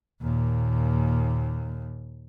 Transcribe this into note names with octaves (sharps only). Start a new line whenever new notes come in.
D#2 A#2